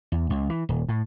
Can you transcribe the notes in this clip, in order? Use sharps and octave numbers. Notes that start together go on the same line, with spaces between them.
E2
C#2
E3
D#1
A2